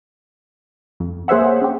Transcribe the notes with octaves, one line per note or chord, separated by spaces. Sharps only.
F2
A#3 G#4 C5 C#5 E5 F#5
C#4 G4